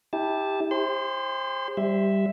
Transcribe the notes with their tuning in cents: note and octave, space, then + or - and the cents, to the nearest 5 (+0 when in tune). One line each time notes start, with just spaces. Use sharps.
E4 -30 G4 +10 A5 -10
G4 +45 C5 +25 C6 -30
G3 +0 E5 +0